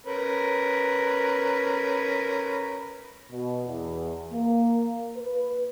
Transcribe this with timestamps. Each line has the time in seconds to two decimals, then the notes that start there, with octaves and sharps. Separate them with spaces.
0.06 C#4 A#4 B4
3.32 B2
3.67 E2
4.32 A#3
5.17 B4